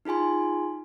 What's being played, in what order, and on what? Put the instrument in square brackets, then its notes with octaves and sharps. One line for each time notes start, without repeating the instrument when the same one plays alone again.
[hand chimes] D#4 F4 G#4 G#5 C6